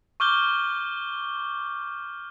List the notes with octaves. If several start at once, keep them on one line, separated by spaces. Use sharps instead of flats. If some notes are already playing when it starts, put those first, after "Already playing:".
C#6 D6 F6 G6 G7